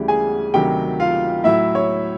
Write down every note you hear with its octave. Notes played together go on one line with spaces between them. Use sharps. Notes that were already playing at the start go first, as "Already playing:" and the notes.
Already playing: D2 C#3 E3 G3 G4
G#4 G#5
D2 C3 D#3 F#3 G4 G5
F4 F5
A2 F#3 E4 E5
C#5